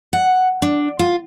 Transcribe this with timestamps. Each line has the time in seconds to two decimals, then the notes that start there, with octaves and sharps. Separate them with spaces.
0.13 F#5
0.62 D4
0.99 F4